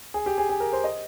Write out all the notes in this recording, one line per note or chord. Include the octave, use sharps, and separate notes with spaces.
G#4
G4
G#4
G#4
A#4
C5
D#5